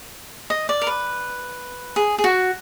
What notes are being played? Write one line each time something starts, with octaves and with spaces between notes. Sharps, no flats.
D#5
D5
A#4
B4
G#4
G#4
F#4